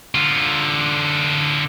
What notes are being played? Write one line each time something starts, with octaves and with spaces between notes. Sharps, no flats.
D3 F4